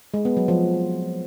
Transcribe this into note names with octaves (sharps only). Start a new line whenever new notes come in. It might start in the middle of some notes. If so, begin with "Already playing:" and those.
G#3
B3
F#3
F3